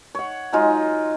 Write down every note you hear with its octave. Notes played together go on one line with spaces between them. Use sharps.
C#5 F#5
F#3 G#3 D#4 F4